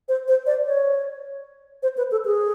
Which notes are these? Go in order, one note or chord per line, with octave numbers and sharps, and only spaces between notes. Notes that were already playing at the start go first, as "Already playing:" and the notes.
C5
C5
D5
C#5
C5
B4
A4
G#4